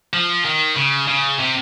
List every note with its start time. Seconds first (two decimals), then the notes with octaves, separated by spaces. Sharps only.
0.14 F3
0.45 D#3
0.76 C#3
1.08 C#3
1.39 C3